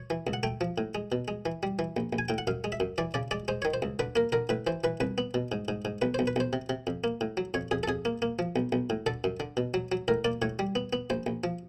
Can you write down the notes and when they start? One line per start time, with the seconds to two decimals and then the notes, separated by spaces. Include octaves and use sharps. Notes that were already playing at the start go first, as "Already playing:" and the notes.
Already playing: C#5
0.10 E3
0.27 C#2
0.33 F#5
0.43 A3 G5
0.61 F3
0.78 A2
0.95 G#3
1.12 B2
1.28 G#3
1.46 E3
1.63 G3
1.79 E3
1.97 A#1
2.13 A#1
2.18 G#5
2.29 A2 G5
2.38 F#5
2.47 F#2 F5
2.64 G#3
2.72 E5
2.80 F#2
2.98 E3 D5
3.14 C#3 D5
3.31 G#3 D5
3.48 G#3 C5
3.62 D#3 C#5
3.74 C5
3.82 C#2
3.99 D3 B4
4.16 A#3 A#4
4.32 D3 A#4
4.49 A2 B4
4.67 E3 C5
4.84 E3 B4
5.00 C2 B4
5.18 B3
5.34 B2
5.52 G#2
5.68 G#2
5.85 G#2
6.02 B1 B4
6.14 B1 C5
6.27 B4
6.36 B1 C5
6.53 C3
6.69 C3
6.87 F2
7.04 A#3
7.21 A2
7.37 F#3
7.54 F2 C#5
7.71 F2 G#4
7.83 A4
7.88 F2 G#4
8.05 A#3
8.22 A#3
8.39 F3
8.56 B1
8.72 B1
8.90 A2
9.06 D3 A4
9.24 F#2
9.40 D3
9.57 B2
9.74 F#3
9.92 F#3
10.08 A2 A#4
10.25 A#3 D5
10.42 A2 C#5
10.59 G3
10.75 B3
10.93 B3
11.10 A#1 C5
11.27 A#1
11.44 F3